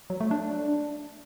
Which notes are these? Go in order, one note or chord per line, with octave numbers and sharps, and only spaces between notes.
F#3
A3
D4